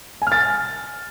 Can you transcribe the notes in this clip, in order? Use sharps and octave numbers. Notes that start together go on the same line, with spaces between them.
G#5
F6
A6